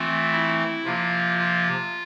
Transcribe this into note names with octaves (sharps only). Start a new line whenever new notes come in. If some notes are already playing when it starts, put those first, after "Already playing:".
Already playing: E3 A3 C4 F4
E4
C3 F3 A#3 F4
F4